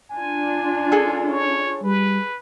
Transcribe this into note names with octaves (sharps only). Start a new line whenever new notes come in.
D4 F4 G#5
G#4 A4
C#5
G3 B4